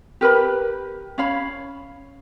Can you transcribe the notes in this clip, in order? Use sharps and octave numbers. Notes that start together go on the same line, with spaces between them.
G4 A#4 B4 B5
C#4 C#5 F5 B5